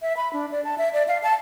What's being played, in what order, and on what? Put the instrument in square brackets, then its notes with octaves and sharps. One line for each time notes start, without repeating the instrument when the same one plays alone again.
[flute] E5
B5
D4
D5
A5
E5
D5
F5
A5